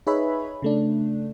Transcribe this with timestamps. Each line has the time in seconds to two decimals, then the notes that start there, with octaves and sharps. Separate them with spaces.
0.07 D#4 G#4 B4 C#5 E5 B5
0.62 C#3 A3 D4